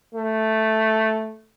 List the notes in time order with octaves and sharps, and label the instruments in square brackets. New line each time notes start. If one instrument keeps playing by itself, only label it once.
[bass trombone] A3